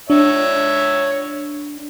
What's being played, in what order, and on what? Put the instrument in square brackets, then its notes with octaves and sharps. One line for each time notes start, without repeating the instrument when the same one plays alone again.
[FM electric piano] D4 [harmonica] C#5 E5